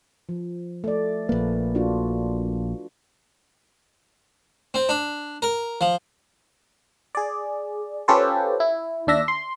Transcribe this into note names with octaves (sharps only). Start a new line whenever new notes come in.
F3
A3 D5
A#1 A#3 B4
D4 F4 F#4
C4
D4
A#4
F3
G#4 D5
C#4 F4 G4 A4 B4 C5
E4
D#2 D4 E5 A#6
C6